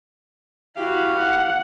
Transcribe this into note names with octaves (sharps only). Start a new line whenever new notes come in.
E4 F#4 G4 F5
F#5